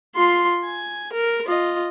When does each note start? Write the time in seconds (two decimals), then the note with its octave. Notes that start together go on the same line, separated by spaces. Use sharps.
0.15 F4 C6
0.65 G#5
1.13 A#4
1.45 F4 D#5